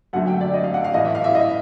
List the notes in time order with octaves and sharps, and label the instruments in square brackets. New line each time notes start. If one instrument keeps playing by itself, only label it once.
[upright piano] F#2 D3 F#3 A3 F#5
G5
D5
D#5
F5
F#5
F5
A2 E3 A3 D#5
E5
F5
E5
D#5